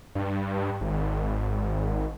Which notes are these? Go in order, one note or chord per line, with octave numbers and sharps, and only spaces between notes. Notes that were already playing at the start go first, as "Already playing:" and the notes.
G2
G#1